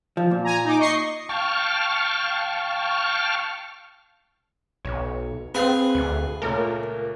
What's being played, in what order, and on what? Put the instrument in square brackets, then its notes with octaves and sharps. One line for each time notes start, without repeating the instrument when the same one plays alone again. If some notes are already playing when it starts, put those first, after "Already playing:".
[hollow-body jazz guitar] F3
A#2
[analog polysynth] G#5 A#5
D#4 D6
D#5 C#6 C7
[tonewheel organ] F5 G5 A5 C#6 F6
[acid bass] B1 [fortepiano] C#5
[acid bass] C4 [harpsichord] G#4 F5 [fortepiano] B4
[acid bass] D2
[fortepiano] C#2 A#2 A3 [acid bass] A#4